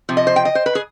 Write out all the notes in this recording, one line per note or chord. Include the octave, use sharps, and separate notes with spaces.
C3 F3
D#5
C5
G5
D#5
C5
B4
G#4